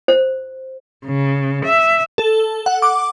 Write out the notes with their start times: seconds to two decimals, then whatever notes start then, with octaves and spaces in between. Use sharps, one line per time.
0.08 C5
1.05 C#3
1.65 E5
2.18 A4
2.66 F#5
2.82 D6